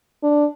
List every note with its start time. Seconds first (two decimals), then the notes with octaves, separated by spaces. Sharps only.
0.23 D4